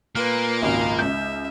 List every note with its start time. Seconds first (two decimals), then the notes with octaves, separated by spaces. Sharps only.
0.15 A#2 A#3 B4 F6
0.62 G#1 C#2 F#4 F5
0.99 C#2 E5 G6